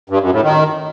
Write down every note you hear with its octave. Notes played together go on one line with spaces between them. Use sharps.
G2
F#2
A2
D#3